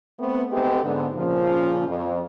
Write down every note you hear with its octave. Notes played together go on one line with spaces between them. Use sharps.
A3 B3 C4
G#3 A3 B3 C4 D#4 G4
G#2 D3 B3
A#2 C#3 F3
F2